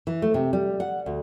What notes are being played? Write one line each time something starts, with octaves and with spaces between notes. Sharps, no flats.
E3
A3
C3
G3
F#5
D2